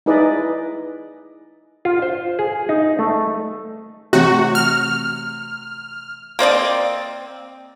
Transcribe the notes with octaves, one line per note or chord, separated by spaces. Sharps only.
D#4 E4 G#4 B4 D5 D#5
F4
C5
G#4
D#4
A3
C3 E3 A3 F#4
F6
A#3 C4 D5 D#5